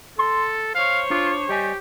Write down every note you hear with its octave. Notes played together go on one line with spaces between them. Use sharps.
A4 C6
C5 C#5 F5
D4 F4
G3 G4 D#5 G#5